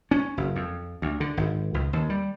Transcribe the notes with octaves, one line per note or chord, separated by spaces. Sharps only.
C#4
F#1
F2
D2
D3
G#1
C#2
D#2
G3